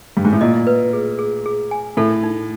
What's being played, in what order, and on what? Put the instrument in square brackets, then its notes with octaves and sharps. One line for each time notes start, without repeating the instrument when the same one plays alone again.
[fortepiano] G2
G#2
A2
[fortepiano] A#2 [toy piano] D#5
[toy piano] B4
G#4
G#4
G#4
G#5
[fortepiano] A2 [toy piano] A4
[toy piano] D#4